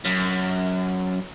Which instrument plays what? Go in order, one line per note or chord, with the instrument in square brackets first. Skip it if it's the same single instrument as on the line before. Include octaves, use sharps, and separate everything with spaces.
[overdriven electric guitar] F#2